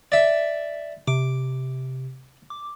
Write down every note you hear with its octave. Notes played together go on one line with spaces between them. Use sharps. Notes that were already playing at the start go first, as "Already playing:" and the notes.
D5 E5
C3 D6
D6